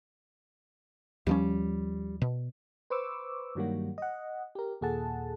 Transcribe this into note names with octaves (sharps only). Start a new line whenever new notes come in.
D#2 F3 G3 C#4
B2
B4 C5 C#6 D6 E6
G2 D#3 F#3 G3 A#3 F#4
D#5 F#5
G4 A#4
D#2 A#2 G#4 A4 F#5 A5